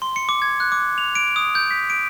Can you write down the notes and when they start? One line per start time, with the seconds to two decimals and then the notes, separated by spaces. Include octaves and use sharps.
0.02 C6
0.16 C#7
0.29 D6
0.42 G#6
0.60 F#6
0.72 D6
0.98 F7
1.15 D7
1.36 D#6
1.55 G6
1.71 B6
1.90 D7